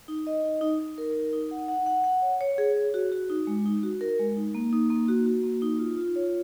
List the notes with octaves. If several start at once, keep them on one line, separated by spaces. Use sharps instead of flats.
D#4
D#5
D#4
D#4
D#4
A#4
D#4
D#4
F#5
F#5
F#5
F#5
C#5
C#5
G#4
C#5
F#4
F#4
D#4
G#3
D#4
F#4
A#4
G#3
D#4
A#3
D#4
A#3
F#4
F#4
A#3
D#4
F4
F4
C#5